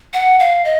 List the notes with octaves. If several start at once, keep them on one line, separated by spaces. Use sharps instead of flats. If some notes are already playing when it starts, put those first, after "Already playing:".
F#5
F5
D#5